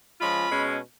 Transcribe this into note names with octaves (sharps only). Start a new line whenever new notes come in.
F3 G#3 C#4 F4 B5
B2 G#3 C#4